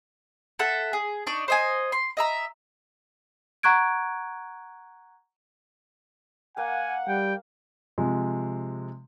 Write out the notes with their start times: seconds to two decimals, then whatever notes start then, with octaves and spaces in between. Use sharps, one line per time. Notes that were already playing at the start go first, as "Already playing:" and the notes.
0.59 A4 E5 F#5
0.93 G#4
1.27 D4 D#4 D5 C#6
1.48 C5 D#5 G#5
1.92 C6
2.17 D#5 E5 A#5
3.63 F#5 A#5 C#6 F#6 G#6 D7
6.57 A#3 F5 F#5 G#5
7.08 G3 G5
7.98 C3 F3 G#3